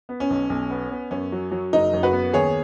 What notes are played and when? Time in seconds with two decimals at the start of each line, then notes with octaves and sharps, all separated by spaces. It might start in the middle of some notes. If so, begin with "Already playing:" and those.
0.09 B3
0.20 C#4
0.30 B1
0.50 B1
0.70 B3
0.91 B3
1.11 F#2 C#4
1.32 F#3
1.51 F#3
1.73 F#1 D#4
1.93 F#2
2.03 F#4 B4
2.13 B3
2.33 D#2 G#4 C#5